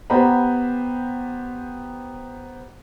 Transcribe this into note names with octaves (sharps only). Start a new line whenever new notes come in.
B3 G4 C5 A#5 B5